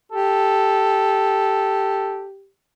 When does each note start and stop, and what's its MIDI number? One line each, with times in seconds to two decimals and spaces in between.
0.12 2.49 67
0.12 2.27 69